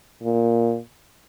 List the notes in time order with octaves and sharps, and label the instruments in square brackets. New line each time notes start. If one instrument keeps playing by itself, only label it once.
[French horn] A#2